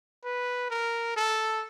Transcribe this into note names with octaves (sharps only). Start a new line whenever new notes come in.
B4
A#4
A4